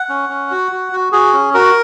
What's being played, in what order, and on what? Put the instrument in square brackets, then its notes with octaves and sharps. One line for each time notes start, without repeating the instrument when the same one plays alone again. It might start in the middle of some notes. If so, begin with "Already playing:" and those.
Already playing: [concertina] F#5
C#4
C#4
F#4
F#4
F#4
F#4 G#4
C#4
F#4 A#4